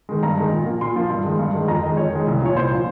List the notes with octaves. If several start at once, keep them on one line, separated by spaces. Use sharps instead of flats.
D#3 G#3
G2 A#5
D#3 G#3
A#2
F3 A#3
A#2 C6
F3 A#3
G2
D#3 G#3
G2
D#3 G#3
F2 A#5
D#3 G#3 D#5
F2 C#5
D#3 G#3
C2
A#2 F3 C#5
C2 C5
A#2 F3